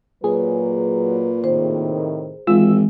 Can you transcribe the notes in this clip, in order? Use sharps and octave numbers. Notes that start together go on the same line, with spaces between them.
A#2 F#3 G#4 B4
A2 C3 D#3 C5
G#1 E3 G#3 F4 E6